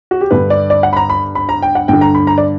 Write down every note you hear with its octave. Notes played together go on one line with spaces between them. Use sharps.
F#4
G4
G2 D3 B4
D5
D5
F#5
B5
A#5
B5
B5
A#5
G5
F#5
G2 D3 G5
A#5
B5
A#5
D5